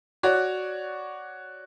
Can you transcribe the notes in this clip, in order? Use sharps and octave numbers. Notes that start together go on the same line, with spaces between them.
F#4 C#5 D5